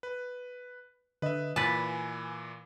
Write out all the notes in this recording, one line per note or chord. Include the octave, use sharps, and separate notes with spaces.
B4
D3 B4 D#5 E5
A#2 E3 B4 G#5 A5 B5